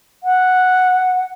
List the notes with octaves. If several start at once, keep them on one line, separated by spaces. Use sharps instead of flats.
F#5